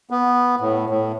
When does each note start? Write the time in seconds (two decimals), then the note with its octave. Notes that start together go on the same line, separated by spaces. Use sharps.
0.10 B3
0.60 A2
0.90 A2